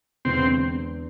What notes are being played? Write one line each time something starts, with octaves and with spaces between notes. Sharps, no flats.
E2 D3 G#3 C4